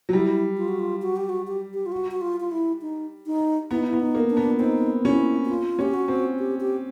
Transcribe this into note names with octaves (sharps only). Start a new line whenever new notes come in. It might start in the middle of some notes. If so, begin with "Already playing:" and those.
F#3
G3 E4
F4
F#4
F4
F#4
G4
F#4
G4
G4
F4
F#4
F#4
F4
F4
E4
D#4
D#4
B3 E4
D#4
E4
B3
D#4
A#3
D4
B3
C4 D#4
C#4 E4
F#4
F4
C#4 G4
F#4
C4
G4
G4